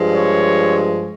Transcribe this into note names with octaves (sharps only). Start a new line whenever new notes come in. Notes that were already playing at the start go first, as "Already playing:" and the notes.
Already playing: G2 F3 G#3
C#5